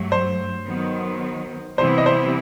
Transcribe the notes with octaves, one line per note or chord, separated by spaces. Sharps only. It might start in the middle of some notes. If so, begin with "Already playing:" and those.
Already playing: G2 F#3 A3
C5
D#3 F#3 B3
C3 E3 G3 B3 E4 C5
D#5
C5